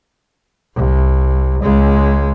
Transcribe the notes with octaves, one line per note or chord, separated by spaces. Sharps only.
C2
C#2 G#3